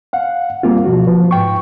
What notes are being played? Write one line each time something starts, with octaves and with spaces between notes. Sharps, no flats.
F5 F#5
G3 A#3 C4 F4
B2 F3 F#4
F3 B4
G#2 G5 C#6